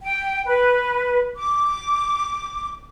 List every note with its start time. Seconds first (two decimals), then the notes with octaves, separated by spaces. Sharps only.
0.02 G5
0.47 B4
1.37 D6